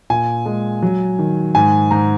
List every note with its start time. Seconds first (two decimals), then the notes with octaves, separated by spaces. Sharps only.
0.10 A#2 G#5
0.46 G#3
0.82 F#3
1.19 D#3
1.55 G#2 G#5
1.91 G#2 A#5